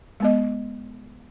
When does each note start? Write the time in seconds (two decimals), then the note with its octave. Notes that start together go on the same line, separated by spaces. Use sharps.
0.20 G#3 B3 D#5